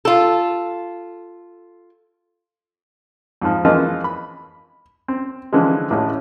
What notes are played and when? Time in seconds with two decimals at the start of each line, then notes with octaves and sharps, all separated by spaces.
0.05 F4 A4
3.42 F2 G#2 F3
3.65 E3 F3 G#3 A#3 D#4 F4
4.04 B5
5.08 C4
5.53 D3 E3 F3 G#3
5.90 A1 A2 G#3 C#4